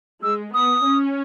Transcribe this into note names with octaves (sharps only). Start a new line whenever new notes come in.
G#3 E6
B3 D#6
C#4